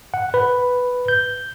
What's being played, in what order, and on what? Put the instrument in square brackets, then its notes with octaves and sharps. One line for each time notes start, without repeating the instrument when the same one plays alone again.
[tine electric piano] F#5
B4
G6